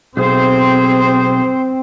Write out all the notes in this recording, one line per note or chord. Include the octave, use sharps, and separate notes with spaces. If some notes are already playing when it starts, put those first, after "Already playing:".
B1 C4 G#4 C5